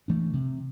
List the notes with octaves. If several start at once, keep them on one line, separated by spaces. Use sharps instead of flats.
E3 A3 D4
C3